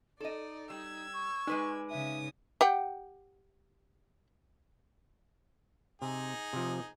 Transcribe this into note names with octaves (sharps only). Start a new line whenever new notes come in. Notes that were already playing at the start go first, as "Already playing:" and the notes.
D#4 A4 D5 D#5
G3 E6 G#6
C#6
G#3 D#4 B4 D5
C#3 E5 G#5 D#6
G4 F#5 G5
C3 D#4 G#4
C3 F3